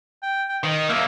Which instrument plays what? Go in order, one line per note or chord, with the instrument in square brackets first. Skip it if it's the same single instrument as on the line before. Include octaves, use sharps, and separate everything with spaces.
[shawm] G5
G5
[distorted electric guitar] D#3 [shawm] D#5
[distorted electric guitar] F#3 A#3 [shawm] E5